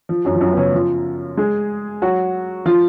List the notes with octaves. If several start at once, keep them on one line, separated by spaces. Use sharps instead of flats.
F3
F#2 F#3
F3
F#2 F#3
B3
C#3 C#4
F3 F4
G#3 G#4
F#3 F#4
F3 F4